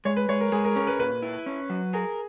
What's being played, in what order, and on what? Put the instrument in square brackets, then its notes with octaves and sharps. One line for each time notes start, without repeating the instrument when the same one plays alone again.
[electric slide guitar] G#3 [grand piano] C#5
[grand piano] B4
[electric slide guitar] G#3 [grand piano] C#5
[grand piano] A#4
[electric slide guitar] G#3 [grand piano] G#4
[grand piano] A#4
[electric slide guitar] C#4 [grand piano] A#4
[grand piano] B4
[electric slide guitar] A#2 [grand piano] B4
[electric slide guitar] E4
C#4
F#3
[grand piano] G#4 [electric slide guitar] A#4